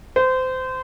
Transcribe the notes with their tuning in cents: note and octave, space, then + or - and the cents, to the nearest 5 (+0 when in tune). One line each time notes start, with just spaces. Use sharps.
C5 -25